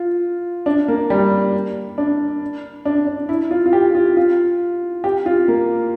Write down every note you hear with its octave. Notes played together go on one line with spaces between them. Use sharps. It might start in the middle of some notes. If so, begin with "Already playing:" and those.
Already playing: F4
D4
A#3
G3
D4
D4
D4
E4
F4
F4
G4
F4
F4
G4
F4
A#3